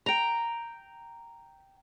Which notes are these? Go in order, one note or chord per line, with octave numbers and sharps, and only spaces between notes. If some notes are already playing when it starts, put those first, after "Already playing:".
G5 A#5